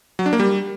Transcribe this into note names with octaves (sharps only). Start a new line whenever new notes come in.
F#3
D4
A#3
G3